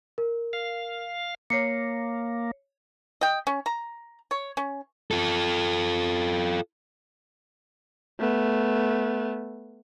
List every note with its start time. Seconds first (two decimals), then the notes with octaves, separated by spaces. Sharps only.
0.18 A#4
0.53 F5
1.50 A#3 C#5 C7 C#7
3.21 D#5 G5
3.47 C#4
3.66 A#5
4.31 C#5
4.57 C#4
5.11 F4 A4
8.19 A3 B3